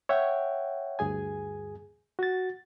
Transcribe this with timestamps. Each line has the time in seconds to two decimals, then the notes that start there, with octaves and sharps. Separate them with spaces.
0.09 C#5 E5 F#5 G5
0.99 D2 G2 G#4 G#5
2.19 F#4 A6